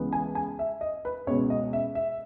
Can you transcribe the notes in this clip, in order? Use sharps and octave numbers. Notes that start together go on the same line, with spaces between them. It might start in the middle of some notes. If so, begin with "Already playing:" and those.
Already playing: C#2 C#3 E3 G#3 B3
G#5
G#5
E5
D#5
B4
C#2 B2 G#3 B3 C#5
D#5
E5
E5